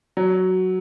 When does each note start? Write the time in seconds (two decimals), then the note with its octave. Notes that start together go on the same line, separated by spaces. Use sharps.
0.17 F#3